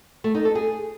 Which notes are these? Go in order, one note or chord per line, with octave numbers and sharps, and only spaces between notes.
A3
D#4
A4
G#4